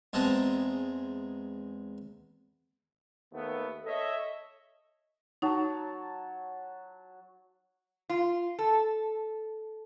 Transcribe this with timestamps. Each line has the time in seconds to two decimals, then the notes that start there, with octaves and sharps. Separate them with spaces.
0.13 E2 G#3 C4 A5 A#5
3.33 D#2 A3 B3
3.85 A4 C#5 D#5 E5
5.42 F#3 D#4 A5
8.09 F4
8.59 A4